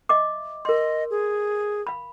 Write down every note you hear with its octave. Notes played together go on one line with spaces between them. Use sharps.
D#5 E5 D6
A#4 D#5 C6
G#4
F5 B5